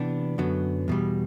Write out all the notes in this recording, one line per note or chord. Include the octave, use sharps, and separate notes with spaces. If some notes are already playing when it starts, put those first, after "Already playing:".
Already playing: C3 E3 B3 D4
F#2 D3 F#3 B3
E2 B2 G3